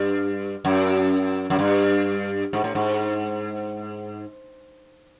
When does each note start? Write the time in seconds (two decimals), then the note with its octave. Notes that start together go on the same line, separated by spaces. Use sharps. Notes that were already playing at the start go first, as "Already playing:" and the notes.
Already playing: G2
0.65 F#2
1.50 F#2
1.59 G2
2.53 G#2
2.64 A2
2.75 G#2